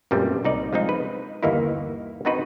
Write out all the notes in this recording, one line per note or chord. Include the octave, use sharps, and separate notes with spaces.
F#2 A#2 G3 A3 B3 C4
C2 D#4 D5
F3 G#3 C4 D#4
B4
G1 D#2 E3 A#3 D#4 E4
B3 C4 D#4 F#4 B4 C5